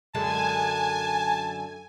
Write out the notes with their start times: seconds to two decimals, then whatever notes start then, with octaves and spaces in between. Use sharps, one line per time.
0.15 F#2 D3 G#3 G#5 A5